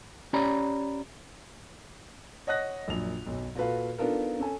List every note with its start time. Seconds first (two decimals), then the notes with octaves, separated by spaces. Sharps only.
0.33 C#4 G4 C#5 D5 A#5 B5
2.47 C#5 D#5 F#5 D#6 F#6 A#6
2.88 A#1 F#2 D4 F7
3.27 B1 F#2
3.55 A#2 F#4 A4 B4 F5
3.98 B3 D4 D#4 F4 A4 A#4
4.39 C#4 A4 G#5